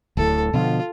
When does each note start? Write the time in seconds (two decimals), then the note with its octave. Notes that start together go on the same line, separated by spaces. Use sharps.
0.17 D1 D2 A2 A4
0.54 B2 D3 F3 F4